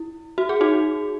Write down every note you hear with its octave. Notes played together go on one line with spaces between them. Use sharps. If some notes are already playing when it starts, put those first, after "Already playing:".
Already playing: E4
F#4
G#4
D#4 F#4